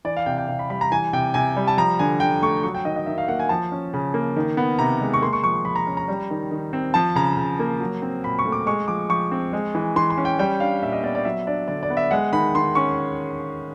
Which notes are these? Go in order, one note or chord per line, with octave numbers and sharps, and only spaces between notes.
E3 D5
F5
C3 G5
G5
C3 F5
B5
G3 B5
A#5
E3 G#5
C3 G5
C3 G#5
G3
A5
F3 A#5
D3 G#5
D3 G5
A3 C#6
F#3 C#6
G5
D#3 D#5
D#5
D#3 E5
F5
A#3 F#5
G#5
F3 A5
C#4
C#3
A#3
D#3
B3
C3 A#5
G#3
C#6
A#3 C6
C#6
F3 C#6
C6
F3 B5
A#5
C#4
A#5
G3
D#3
D#3
C4
F3 A5
C#3 A#5
C#3
A#3
F#3
C4
A#2 B5
C#6
A3
D6
G#3 C#6
F3 D6
F3 C#6
C4
G#3
E3
E3 C6
C6
C#4
G5
G3 G5
D4 F5
A#2 E5
D#5
B3 D5
D5
F#3 E5
D4 D5
D3 D5
D5
B3
E5
G#3 F#5
D#3 B5
D#3 C6
C#4 C#6